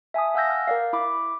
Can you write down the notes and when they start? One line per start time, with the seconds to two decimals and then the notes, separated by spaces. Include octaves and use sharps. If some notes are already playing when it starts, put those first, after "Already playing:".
0.14 E5 G#5 A5 D#6
0.34 F5 F#5 G#5 E6 G6 A#6
0.50 F6
0.67 A#4 D5 F5
0.93 E4 B5 D6